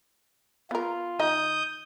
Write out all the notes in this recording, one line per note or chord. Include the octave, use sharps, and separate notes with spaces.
B3 F4 A#4
D#3 D#4 D#5 D#6 G6